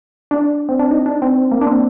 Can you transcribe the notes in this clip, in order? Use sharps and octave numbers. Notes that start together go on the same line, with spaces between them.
D4
C4
D4
D#4
D4
C4
A#3
D4
C4